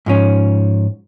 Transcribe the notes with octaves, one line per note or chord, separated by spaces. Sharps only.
G#2 F3 C#4